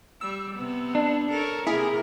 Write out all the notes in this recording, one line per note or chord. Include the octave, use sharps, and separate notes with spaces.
G3 E6
C3 B3
D4
A4 A#4 C#5
C3 A#3 E4 G#4 A#4